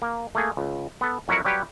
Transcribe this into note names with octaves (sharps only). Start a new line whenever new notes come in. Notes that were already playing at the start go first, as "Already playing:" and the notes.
A#3
A3 A#3 G#4
C#2
B3 A4
F2 F#3 E4 F#4 A#4 F#5
F#3 G3 G4 B4 C#5